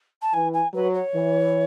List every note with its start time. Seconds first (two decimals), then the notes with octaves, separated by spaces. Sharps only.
0.21 A5
0.33 E3 G#5
0.53 G#5
0.74 F#3 B4
0.94 C#5
1.15 E3